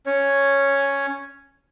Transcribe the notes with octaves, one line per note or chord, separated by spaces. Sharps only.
C#4 C#5